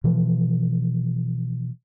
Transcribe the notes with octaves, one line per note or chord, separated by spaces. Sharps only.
B2 E3 F3